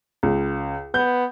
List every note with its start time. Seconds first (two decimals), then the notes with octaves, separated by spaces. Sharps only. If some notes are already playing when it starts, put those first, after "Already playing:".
0.23 C#2
0.94 B3 G6